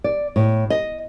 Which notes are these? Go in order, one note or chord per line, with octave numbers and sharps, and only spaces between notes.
D5
A2
D#5